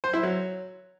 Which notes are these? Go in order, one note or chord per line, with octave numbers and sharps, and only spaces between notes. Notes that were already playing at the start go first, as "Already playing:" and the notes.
C5
E4
F#3